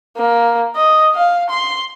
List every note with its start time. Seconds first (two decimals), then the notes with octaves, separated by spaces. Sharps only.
0.17 A#3
0.76 D#5
1.15 F5
1.50 C6